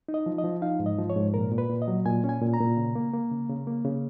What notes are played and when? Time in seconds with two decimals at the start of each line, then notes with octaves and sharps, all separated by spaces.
0.08 D#4
0.14 D#5
0.26 F3
0.38 D#5
0.44 F3
0.62 D#4 F5
0.80 G#2
0.86 D#5
0.98 F3
1.10 C#5
1.16 G#2
1.34 A#2 A#4
1.52 A#2
1.58 B4
1.69 A#2
1.82 D#5
1.88 F#3
2.05 A#2 G#5
2.24 C#4
2.29 G#5
2.42 A#2
2.54 A#5
2.60 A#2
2.77 C#3
2.95 A#3
3.13 A#3
3.32 C#3
3.49 C#3
3.67 A#3
3.85 C#3